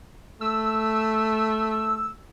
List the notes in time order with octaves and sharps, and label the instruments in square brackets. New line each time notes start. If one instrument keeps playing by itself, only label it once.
[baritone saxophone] A3 [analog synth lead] E6